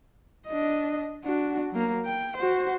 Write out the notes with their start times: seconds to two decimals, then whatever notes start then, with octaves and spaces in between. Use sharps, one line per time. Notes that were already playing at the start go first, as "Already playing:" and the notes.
0.47 D4 D#5
1.24 D4 F#4
1.71 F#3 A#3
2.05 G5
2.36 F#4 C5